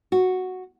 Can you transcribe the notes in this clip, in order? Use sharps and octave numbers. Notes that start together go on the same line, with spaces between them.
F#4